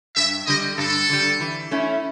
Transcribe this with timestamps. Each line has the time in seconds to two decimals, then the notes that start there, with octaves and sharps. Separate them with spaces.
0.16 G2 E5
0.47 D3 G3 D#5
0.78 G2 A4
1.10 D3 G3
1.40 E3
1.71 A3 C#4 E4